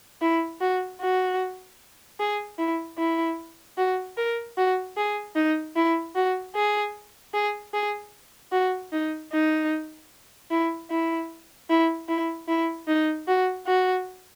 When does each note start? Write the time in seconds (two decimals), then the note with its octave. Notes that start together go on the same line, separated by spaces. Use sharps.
0.22 E4
0.61 F#4
1.01 F#4
2.20 G#4
2.59 E4
2.98 E4
3.78 F#4
4.17 A#4
4.58 F#4
4.97 G#4
5.36 D#4
5.76 E4
6.16 F#4
6.55 G#4
7.34 G#4
7.74 G#4
8.52 F#4
8.92 D#4
9.32 D#4
10.51 E4
10.91 E4
11.70 E4
12.09 E4
12.48 E4
12.88 D#4
13.28 F#4
13.67 F#4